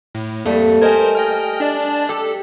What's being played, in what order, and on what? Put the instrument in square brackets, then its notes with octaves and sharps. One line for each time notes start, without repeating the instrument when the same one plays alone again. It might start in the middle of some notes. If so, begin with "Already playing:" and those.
[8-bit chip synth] A2
[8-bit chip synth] F2 [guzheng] G3 A3 [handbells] A#3
[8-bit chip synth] A#4 C5 D#5 [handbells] G#5 G#6
[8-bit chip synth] D#5 G5 F6
D4 D5 A5
[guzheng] G4 [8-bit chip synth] A4